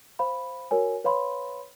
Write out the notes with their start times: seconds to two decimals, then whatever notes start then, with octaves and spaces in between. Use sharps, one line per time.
0.19 C5 F5 B5
0.71 F#4 A#4 C#5 G#5
1.04 B4 C#5 F5 B5 C6